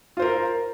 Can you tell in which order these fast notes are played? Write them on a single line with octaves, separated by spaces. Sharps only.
F4 C5 A#4